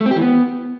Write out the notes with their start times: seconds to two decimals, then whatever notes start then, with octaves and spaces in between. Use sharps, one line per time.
0.01 A3
0.06 C4
0.11 G4
0.16 E3
0.21 B3